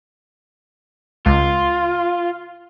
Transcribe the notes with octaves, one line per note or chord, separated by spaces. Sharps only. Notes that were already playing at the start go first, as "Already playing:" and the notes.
C#2 F4